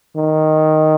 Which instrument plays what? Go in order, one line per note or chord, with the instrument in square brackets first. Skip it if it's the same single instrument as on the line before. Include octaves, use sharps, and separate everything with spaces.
[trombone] D#3